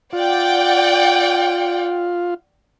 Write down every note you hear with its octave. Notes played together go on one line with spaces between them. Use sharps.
F4 D5 F#5 G5